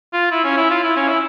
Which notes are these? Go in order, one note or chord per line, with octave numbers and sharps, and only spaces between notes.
F4
E4
C#4
E4
F4
E4
C#4
E4